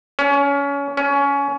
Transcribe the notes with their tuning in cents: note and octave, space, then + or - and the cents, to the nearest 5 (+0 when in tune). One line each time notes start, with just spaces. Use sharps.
C#4 +25
C#4 +20